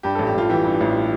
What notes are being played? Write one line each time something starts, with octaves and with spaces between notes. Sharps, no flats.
G2 G4
A1 A4
G4
A1 F4
E3 G4
G2
A1